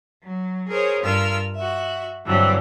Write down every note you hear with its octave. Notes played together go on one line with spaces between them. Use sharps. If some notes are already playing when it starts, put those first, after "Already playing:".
F#3
G#4 A#4 C5 C#5
G2 F4 A#4 E6 F6
F#4 E5
G2 D3 E3 F#3 C4